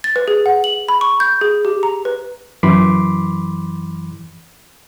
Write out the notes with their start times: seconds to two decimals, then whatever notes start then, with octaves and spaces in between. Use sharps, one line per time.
0.04 A6
0.16 B4
0.28 G#4
0.46 F#5
0.64 F#7
0.89 B5
1.01 C#6
1.20 G6
1.41 G#4
1.65 G4
1.83 A#5
2.05 B4
2.63 F#2 E3 B5 C6 D6